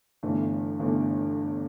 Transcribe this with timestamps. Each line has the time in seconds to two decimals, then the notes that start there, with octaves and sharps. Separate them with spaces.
0.23 G1 G2 E3 A3
0.79 G1 G2 E3 A3